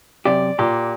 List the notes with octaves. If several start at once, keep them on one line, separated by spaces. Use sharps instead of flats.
F#2 C3 G4 D5
A#2 G4